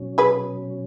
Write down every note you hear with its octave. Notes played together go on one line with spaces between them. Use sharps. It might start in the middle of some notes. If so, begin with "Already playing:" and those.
Already playing: B2 F#3 C#4
G#4 B4